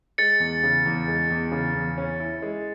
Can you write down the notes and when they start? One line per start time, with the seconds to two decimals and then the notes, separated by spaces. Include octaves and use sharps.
0.18 G#3 A6 C#7
0.40 E2
0.63 C#3
0.86 E2
1.08 G#3
1.31 E2
1.52 C#3
1.74 E2
1.97 C#4
2.20 E4
2.42 G#3